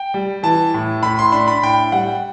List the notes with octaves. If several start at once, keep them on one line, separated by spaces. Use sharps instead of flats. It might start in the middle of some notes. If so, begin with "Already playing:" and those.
Already playing: G5
G3
E3 A5
A2
A2 B5
C6
D4 B5
B5
A2 G5
G3 F#5